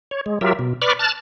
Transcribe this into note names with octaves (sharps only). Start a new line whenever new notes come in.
C#5
G#3
F#3 F4 G4 A#4 E5
B2
B4 D5 B5 C#6 D6 F6
A5 F6 F#6 A6